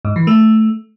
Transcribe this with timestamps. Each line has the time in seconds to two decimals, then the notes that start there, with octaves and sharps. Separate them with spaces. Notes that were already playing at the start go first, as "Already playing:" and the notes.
0.05 G#2
0.16 E3
0.27 A3